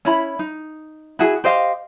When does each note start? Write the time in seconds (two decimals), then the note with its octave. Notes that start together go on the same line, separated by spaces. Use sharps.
0.05 C#4 E4 B5
0.39 D#4
1.19 E4 F#4 G#4
1.44 G4 C5 D#5 F5